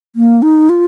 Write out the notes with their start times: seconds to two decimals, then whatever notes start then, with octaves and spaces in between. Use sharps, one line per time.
0.16 A#3
0.42 D#4
0.69 F4